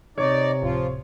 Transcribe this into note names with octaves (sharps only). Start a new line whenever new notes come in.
C3 D#4 C#5 D5
D1 F3 F4